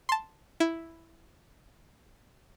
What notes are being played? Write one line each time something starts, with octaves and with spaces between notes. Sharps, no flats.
A5 C6
E4